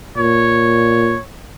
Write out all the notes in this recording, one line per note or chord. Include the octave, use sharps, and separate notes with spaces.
A#2 C#5